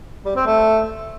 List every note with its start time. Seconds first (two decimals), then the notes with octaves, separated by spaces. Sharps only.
0.25 G3
0.36 C4
0.46 A3